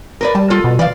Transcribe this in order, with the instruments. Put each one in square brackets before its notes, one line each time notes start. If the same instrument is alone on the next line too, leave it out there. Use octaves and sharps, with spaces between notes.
[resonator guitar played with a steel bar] A#4 B4 D5
[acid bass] G3 [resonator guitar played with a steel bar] A5
[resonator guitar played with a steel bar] F4 A4
[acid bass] B2
[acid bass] E3 [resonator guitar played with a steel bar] D5 F5